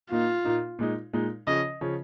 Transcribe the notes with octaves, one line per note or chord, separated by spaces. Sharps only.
A#2 A#3 D#4 F4
A#2 A#3 D#4
A#2 G#3 D#4
A#2 G#3 D#4
C#3 F3 C#4 D#5
C#3 F3 C#4